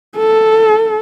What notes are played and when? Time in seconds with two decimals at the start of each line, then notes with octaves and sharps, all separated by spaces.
0.17 A4